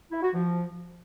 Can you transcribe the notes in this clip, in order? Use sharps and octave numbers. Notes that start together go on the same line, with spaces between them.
E4
F#4
F3